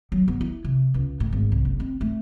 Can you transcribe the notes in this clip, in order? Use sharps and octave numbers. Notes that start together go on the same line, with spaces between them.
F#3
B3
E4
C3
C#2
A2
G#1
C2
F#1
C4
A3